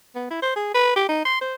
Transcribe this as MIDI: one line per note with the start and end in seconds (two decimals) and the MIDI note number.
0.15 0.27 59
0.31 0.38 64
0.42 0.53 72
0.56 0.73 68
0.75 0.94 71
0.96 1.07 67
1.09 1.22 63
1.25 1.37 84
1.41 1.55 72